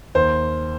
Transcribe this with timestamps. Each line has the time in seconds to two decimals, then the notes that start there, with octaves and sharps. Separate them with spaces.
0.15 D#2 C5